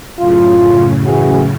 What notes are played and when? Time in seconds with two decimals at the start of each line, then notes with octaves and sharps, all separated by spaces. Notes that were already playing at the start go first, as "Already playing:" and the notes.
0.19 F#2 A2 C#3 F4
1.04 E3 F#4 G#4